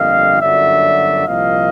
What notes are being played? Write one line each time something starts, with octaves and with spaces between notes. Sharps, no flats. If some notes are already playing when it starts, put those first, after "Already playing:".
Already playing: G1 F2 D3 G3 A#3 D#5 F5
G1 F#2 D3 F#3 D5 E5
C2 A#2 F3 A#3 D#5 F5